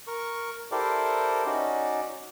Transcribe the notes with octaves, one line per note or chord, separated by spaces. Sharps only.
A#4 C#6
E4 G4 A4 A#4 C5 D5
C#4 D#4 F#4 D5